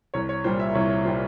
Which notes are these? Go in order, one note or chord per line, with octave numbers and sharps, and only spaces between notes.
C2 C#5
C#5
A#2 G3 C5
E5
C2 C#5
C#5
A#2 G3 C5